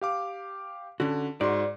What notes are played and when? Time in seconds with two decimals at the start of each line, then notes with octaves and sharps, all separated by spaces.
0.01 G4 F5 D6
1.00 D3 C#4 F#4
1.41 G#2 F#4 D5 C6